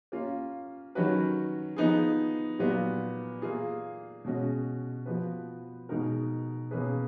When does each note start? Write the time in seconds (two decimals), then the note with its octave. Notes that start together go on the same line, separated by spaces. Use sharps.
0.12 A#3 C#4 F4
0.95 D#3 F#3 C#4 F#4 B4
1.76 F3 B3 D#4 G#4
2.59 A#2 F#3 B3 F4
3.42 A#3 F4 G#4
4.25 B2 G#3 C#4 F#4
5.06 F3 B3 F#4 B4
5.89 B2 G#3 D#4 F#4 A#4
6.71 B2 A#3 C#4 G#4 B4